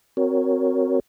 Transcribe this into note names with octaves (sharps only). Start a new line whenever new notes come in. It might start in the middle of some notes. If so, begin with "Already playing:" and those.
C4 F#4 A#4 C#5